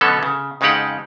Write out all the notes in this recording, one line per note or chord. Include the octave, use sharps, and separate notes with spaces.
B2 D3 F#3 B3 C#4 A4
C#3
F2 C#3 G#3 D#4 G4 F#5